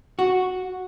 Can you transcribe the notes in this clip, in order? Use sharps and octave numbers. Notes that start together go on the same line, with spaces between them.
F#4